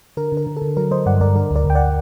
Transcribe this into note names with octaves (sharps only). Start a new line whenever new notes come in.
D3 A#4
D3
A#4
D3
A4
D3
F#3 A#4
F#3 C5 D#5
G2 D5 F#5
G2 A#4 D5
D3 A#4
D2 A#4 D5
D2 G5
D5 F#5